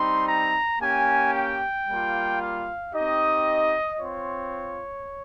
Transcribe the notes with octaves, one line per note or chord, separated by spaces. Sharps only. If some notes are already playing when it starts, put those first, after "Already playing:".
Already playing: G3 C4 D#4 C6
A#5
A#3 C#4 G4 G#5
G5
G3 A#3 F4
F5
C4 D#4 G4 D#5
C4 F4 C#5